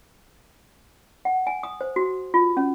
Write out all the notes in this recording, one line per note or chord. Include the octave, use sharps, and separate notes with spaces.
F#5
G#5
D#6
C5
F#4
F4
C#4